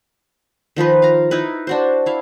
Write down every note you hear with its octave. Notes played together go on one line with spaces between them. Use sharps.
D#3 F3 D#4 B4
F5 A#5
D#4 E4 B4
D4 F#4 C5
E4 F5